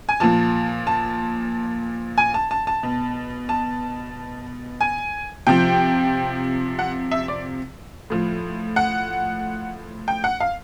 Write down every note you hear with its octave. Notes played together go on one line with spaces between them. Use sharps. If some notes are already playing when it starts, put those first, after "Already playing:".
G#5
A#2 F3 A5
A5
G#5
A5
A5
A5
B2
A5
G#5
C3 F3 G5
F#5
E5
D5
A2 F3
F#5
G5
F#5
F5